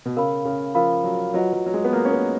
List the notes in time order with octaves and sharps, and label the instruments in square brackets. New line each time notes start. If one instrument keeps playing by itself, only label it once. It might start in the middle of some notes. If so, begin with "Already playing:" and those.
[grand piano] B2
[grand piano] C#3 [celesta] A#4 F5 B5
[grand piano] C#3
[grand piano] F3 [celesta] A#4 F5 B5
[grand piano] F#3
[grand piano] F#3 [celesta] F4 B4 D#5 F#5
[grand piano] F#3
F#3
G#3
B3
[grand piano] A#3 [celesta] F4 B4 D#5 F#5
[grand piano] C#4
B3